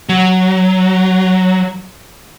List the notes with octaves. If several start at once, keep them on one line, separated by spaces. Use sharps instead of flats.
F#3